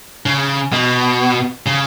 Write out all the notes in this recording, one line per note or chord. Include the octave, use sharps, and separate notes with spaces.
C#3
B2
C#3